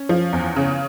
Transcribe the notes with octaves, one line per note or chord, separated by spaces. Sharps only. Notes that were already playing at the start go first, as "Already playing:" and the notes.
Already playing: C#4
F3
E2
C#3